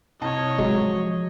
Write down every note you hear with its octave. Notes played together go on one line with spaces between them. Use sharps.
C2 C#5 D#5 A5
F3 F#3 G#3